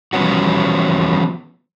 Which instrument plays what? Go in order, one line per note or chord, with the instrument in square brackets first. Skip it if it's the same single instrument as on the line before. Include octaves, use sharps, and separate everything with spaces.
[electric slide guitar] E3 F3 G3 B3 C#4 F#4